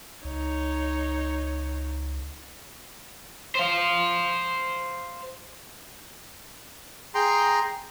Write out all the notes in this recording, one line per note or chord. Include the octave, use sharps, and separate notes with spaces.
C#2 D#4 C#5
C5 F5
G#4 G5 A#5 C6